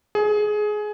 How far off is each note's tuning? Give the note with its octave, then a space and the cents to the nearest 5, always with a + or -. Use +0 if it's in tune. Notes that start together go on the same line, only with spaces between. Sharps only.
G#4 +20